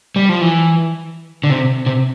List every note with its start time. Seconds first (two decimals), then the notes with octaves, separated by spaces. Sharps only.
0.16 G3
0.29 F3
0.41 E3
1.44 D3
1.50 C3
1.86 C3